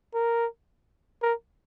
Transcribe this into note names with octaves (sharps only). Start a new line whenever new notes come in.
A#4
A#4